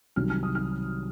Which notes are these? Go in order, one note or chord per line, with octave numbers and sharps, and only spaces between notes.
C2 C3 D#3 F#3 F6
F6
D#6
F6